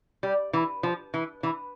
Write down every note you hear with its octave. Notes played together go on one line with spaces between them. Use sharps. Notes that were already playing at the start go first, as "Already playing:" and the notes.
G3
E3
F3
E3
E3